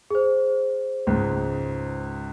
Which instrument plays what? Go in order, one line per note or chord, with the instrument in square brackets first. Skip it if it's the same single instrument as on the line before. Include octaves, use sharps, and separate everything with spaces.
[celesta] G#4 C5
[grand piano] C#2 G#2